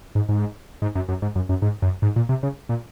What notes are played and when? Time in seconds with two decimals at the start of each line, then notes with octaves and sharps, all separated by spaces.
0.15 G#2
0.29 G#2
0.82 G#2
0.95 F#2
1.09 F#2
1.22 G#2
1.35 F#2
1.49 F#2
1.62 G#2
1.82 F#2
2.02 G#2
2.16 A#2
2.29 C3
2.43 C#3
2.69 A#2